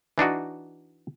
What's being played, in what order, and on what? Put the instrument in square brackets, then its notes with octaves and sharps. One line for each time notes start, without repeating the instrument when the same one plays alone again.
[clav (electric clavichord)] E3 D4 D#4 F#4